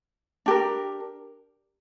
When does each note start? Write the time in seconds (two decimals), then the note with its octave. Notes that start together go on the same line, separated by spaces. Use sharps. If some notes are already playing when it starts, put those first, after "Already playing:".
0.46 D4 G4 A#4